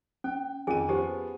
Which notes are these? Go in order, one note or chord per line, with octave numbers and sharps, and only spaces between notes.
C#4 G5
F2 D#3 C#4 G#4 G#5 D#7
F3 B3 G4 C5